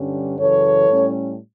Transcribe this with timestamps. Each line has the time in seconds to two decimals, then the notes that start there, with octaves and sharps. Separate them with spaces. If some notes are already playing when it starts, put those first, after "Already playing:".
Already playing: G2 D3 G3 C#4
0.40 F#2 C#3 E3 A4 C#5
0.89 A2 G3 C#4